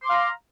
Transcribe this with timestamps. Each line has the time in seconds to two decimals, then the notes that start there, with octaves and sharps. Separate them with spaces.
0.01 C6
0.05 D6
0.08 F5
0.11 A#5